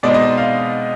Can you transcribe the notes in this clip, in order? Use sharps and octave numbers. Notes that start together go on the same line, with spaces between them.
B2 G#3 C4 D#4 D5
D#5
F5